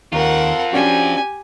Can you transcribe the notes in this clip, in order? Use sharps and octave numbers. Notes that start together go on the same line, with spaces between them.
D#2 C4 F4 A#4 F#5
C#4 D4 F#4 G4 G#5